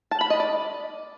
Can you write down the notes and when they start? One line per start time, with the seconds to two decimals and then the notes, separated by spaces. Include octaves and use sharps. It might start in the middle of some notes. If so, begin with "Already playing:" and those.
0.11 A5
0.21 B5
0.30 D#5
0.40 D5